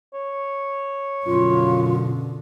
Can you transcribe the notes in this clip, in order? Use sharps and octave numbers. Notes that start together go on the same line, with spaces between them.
C#5
F#2 B2 D3 F4